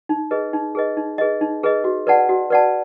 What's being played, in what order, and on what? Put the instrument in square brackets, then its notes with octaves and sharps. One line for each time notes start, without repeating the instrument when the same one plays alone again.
[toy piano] D#4
G#4 B4 D#5
D#4
G#4 B4 D#5
D#4
G#4 B4 D#5
D#4
G#4 B4 D#5
F#4
B4 D5 F#5 A5
F#4
B4 D5 F#5 A5